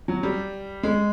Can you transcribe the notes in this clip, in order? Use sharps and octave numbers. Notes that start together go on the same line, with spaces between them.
F#3
G3
G#3